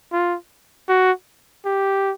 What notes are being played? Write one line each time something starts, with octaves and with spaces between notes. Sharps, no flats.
F4
F#4
G4